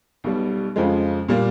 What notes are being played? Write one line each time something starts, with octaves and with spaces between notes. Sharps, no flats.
B1 B2 G3
F2 C#3 F3 G#3
A#2 G3 A#3